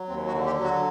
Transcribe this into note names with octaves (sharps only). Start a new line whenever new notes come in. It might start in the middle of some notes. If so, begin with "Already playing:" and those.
Already playing: F#3
D#2 C4
F#4
D3
G4
F#3
F#4